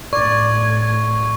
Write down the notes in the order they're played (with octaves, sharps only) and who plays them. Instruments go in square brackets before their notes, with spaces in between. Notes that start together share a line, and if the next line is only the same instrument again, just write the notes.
[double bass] A2 [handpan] D5 [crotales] C#6 [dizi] G#6